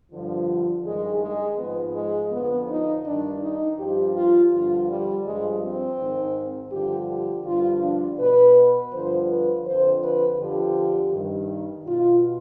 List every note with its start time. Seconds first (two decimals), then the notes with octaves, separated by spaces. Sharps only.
0.12 G2 D3 F3
0.85 G2 D#3 G#3
1.22 G#3
1.58 G#2 F3 B3
1.95 G#3
2.32 F2 D3 F3 B3
2.69 D#4
3.05 G2 D#3 D4
3.42 D#4
3.79 G2 F3 G4
4.16 F4
4.52 G2 D3 F3 F4
4.90 G3
5.25 G2 F3 G#3
5.62 C4
6.00 G#2 D#3
6.72 G2 D3 F3 G4
7.09 G4
7.46 G2 D3 F3 F4
7.83 D4
8.19 B2 B4
8.93 G2 D3 F3 C5
9.29 B4
9.66 F2 D3 F3 C5
10.03 B4
10.39 F2 D3 F3 G4
11.13 G2 D#3
11.87 B2 F4